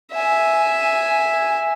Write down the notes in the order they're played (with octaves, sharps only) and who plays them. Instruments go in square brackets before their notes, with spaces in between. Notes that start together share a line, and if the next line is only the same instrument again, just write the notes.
[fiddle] E5 G#5